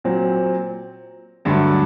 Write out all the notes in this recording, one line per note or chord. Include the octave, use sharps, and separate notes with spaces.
A#2 F#3 C4
G2 D3 F#3 A3